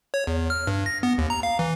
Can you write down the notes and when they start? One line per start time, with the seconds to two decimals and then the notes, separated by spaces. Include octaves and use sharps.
0.14 C#5
0.27 E2
0.50 F6
0.67 G2
0.86 A#6
1.03 B3
1.18 D#2
1.30 A#5
1.43 F5
1.59 E3